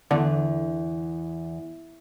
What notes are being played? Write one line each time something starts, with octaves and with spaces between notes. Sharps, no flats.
E2 D3